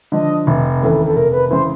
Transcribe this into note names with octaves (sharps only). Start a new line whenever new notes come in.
D3 F3 D#5
F1
D#2 C#3 E3 A4
A4
F1 A#4
B4
C#3 E3 C5